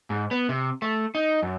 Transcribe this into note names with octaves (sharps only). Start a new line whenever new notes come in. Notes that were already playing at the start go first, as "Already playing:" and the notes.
G#2
B3
C3
A3
D#4
F#2